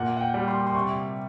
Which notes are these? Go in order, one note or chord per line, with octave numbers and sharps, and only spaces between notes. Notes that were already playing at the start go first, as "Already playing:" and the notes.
Already playing: A#2 F#5
F#5
G5
G3
C6
C6
C3 C#6